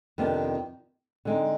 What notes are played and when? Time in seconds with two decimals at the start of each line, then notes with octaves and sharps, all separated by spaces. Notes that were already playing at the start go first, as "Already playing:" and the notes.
0.18 F2 C3 D#3 B3 D4
1.25 D3 G#3 C4 D#4